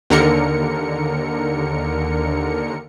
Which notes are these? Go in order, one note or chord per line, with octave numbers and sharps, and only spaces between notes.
D#2 D3 A#4 C#7